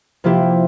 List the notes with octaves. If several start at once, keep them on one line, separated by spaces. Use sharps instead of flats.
C3 F3 A#3 E4 G4